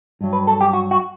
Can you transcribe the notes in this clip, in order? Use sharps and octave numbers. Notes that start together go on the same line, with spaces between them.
G2 F#3
B4
A4
G4
F#4
F#4